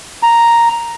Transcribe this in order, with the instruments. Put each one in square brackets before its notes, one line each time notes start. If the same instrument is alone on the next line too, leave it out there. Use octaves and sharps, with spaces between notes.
[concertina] A#5